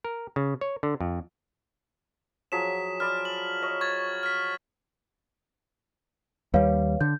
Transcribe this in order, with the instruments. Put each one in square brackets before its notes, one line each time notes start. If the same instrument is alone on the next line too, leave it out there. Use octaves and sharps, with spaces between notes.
[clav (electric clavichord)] A#4
C#3
C#5
D3
F2
[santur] F3 F#3 G#4 [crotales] B6 E7
[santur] D5 B5 C6 [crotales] F6
[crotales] F#7
[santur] C#5 D#5
[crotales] C#6 G#6 A6
F6 B6
[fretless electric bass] D#2 G3 [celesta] B4 C#5 F5
[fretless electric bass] D3 [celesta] G6